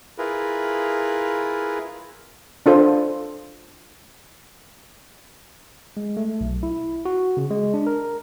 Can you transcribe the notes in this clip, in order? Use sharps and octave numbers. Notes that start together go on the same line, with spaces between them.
E4 F4 G#4 A#4 B4
D4 F4 A4 C5
G#3
A3
B1
E4
F#4
C#3
G#3
D4
A#4